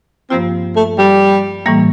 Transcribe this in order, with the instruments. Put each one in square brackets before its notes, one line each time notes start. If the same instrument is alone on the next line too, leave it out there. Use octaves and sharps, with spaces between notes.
[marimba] G2 F3 A#3 F4 [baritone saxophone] C4
[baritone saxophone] A3
G3
[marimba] A2 E3 G3 A#3